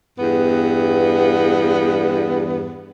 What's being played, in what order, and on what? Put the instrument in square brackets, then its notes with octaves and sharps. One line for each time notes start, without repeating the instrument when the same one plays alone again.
[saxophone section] E2 G2 B3